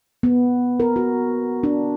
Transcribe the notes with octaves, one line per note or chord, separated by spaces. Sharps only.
B3
A#4
F#4
D4